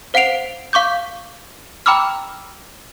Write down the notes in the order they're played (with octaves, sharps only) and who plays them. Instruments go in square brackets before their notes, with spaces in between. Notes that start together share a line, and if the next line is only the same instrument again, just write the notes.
[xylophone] C5 F5 F#5 C7 D7 F7
F5 C#6 D6 G6
G5 A#5 B5 D6 E6 F6